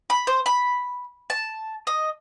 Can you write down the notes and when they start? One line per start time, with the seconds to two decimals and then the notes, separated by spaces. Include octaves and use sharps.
0.10 B5
0.27 C5
0.46 B5
1.30 A5
1.87 D#5